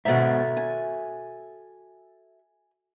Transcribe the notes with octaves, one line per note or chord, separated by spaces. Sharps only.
G#2 B2 F#4 A4 E5
G#5